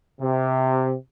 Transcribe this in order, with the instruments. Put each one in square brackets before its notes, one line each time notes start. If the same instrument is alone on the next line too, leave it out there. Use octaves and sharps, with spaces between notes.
[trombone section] C3